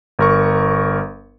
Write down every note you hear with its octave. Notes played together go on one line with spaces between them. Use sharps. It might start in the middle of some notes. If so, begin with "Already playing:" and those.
G1 A#4 C#6